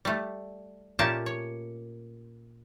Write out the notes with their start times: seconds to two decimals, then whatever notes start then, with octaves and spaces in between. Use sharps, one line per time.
0.05 G3 A3
0.99 A#2 A3 A#3 C#4 G4 A5
1.26 C#5